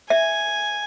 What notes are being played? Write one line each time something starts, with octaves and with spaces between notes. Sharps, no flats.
E5 G#5